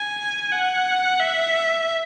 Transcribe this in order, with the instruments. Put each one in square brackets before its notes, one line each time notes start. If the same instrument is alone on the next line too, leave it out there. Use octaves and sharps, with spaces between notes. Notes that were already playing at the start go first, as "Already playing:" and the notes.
Already playing: [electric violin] G#5
F#5
E5